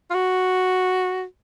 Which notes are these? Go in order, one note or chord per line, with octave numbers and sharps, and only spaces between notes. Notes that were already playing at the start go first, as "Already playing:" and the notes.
F4
F#4